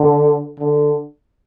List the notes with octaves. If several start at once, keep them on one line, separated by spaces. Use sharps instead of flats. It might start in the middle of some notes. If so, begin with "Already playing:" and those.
Already playing: D3
D3